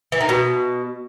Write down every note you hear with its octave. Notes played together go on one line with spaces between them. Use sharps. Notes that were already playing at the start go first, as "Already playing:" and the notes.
E3
D#3
B2